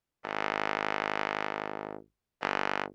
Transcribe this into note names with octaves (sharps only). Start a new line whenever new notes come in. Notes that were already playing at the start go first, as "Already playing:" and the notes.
G#1
G1